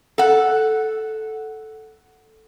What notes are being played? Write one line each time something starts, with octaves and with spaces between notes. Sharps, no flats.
A4 F#5